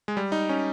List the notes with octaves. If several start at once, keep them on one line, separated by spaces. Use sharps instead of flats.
G#3
G3
D#4
C#4